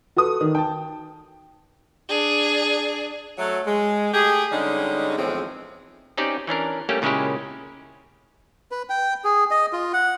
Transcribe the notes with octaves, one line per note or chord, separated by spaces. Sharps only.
F#4 A4 B4 D#6
D#3
G5 A5
D4 G#4
F#3 A3
G#3
A3 G4 G#4
D3 G3 G#3 C#4 D#4
E2 A2 F3 G#3 C4
C4 C#4 D#4 G4 D5
E3 C#4 D4 A#4
G3 A3 A#3 C#4 G4
A#2 C#3 G#3 C#4 E4 G4
B4
G5
G#4
D#5
F4
F#5